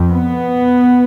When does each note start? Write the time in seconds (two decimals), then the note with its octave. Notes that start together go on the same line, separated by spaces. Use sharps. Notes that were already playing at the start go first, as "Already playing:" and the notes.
Already playing: F2
0.11 B3